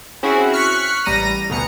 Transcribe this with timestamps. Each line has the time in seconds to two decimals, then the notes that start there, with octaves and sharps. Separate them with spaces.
0.23 C4 C#4 E4 F#4 G#4
0.53 C#6 F6 F#6 B6 C#7
1.06 A1 G3 A#5 A#6 D#7
1.50 D2 B2 A#5 C#7